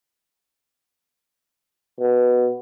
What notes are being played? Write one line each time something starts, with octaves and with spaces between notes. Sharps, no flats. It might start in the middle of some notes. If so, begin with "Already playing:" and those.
B2